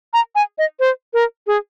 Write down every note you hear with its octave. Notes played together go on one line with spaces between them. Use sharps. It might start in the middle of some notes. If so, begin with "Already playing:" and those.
A#5
G#5
D#5
C5
A#4
G#4